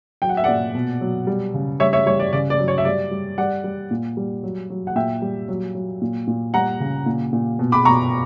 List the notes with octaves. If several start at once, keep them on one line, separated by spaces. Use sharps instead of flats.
F#3 G5
F#5
E5
A#2 D5 F#5
B2
F#3
G3
C#3
G3 C#5 E5
C#5 E5
G3 C#5
D5
C#3 D5
D5
F#3
C#5
E5
G3 D5
G3
G3 D5 F#5
G3
A#2
G3
F#3
F#3
F#5
A#2 E5 G5
G3
F#3
F#3
A#2
A#2
G3 F#5 A#5
C#3
A#2
A#2
B2
B5 D6
B2 A#5 C#6